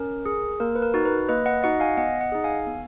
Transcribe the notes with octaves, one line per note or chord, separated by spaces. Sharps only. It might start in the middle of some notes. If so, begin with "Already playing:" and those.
Already playing: C#4 A#4
G#4
A#3 A#4
B4
A#4
D#4 F#4
B4
A#3 B4 D#5
D#5 F#5
D#4 F#4 D#5 F#5
F5 G#5
B3 D#5 F#5
D#5 F#5
D#4 G#4
F5 G#5
B3